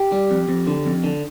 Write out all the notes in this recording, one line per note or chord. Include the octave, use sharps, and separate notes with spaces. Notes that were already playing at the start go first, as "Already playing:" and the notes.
Already playing: G4
G3
F2
F2
D3
F2
D3